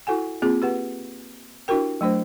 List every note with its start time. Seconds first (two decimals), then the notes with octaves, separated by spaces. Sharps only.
0.07 E4 F#4 A4 F#5 G#5
0.42 A#3 C4 F4 G#4
0.62 G4 B4 F#5
1.68 D4 E4 F#4 G4 A#4 G5
2.01 F#3 A3 D4 C5